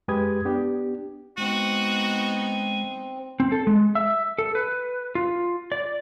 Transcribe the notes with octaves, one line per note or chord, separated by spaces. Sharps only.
F#2 G#3 G4 B4 D#6 G#6
B3 D4 G4
G#3 B3 C4 D#4 F#4
C4
A4
G#3
E5
A4
B4
F4
D5